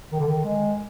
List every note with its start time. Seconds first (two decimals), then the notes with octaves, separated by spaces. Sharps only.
0.12 D#3
0.20 D3
0.28 D#3
0.44 G#3